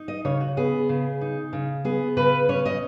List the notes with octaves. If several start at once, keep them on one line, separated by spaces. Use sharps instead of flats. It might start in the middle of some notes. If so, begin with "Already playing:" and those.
Already playing: D#4
D#5
C#3 C#5
F#4
B3 G#4
C#3
D#4
C#3
B3 G#4
C#3 B4
C#4 C#5
D#5